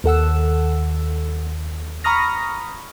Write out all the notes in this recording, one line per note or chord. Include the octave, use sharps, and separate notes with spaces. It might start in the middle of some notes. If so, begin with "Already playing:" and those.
D#2 A4 F#5 E6
A#5 B5 C#6 D#6 F6 A#6